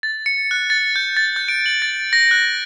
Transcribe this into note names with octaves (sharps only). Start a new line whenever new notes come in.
A6
C#7
F#6
A6
G6
A6
G6
D7
F#7
A6
A#6
F#6